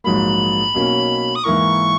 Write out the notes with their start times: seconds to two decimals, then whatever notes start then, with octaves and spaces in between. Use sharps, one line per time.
0.04 A#1 G#2 F#3 A#3 B5
0.74 B1 B2 F#3 A#3 C#4
1.35 D#6
1.44 G#2 E3 A#3 E4 A#4 C#6